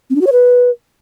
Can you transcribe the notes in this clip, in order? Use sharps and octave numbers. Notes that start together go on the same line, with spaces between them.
C4
D4
F#4
C#5
B4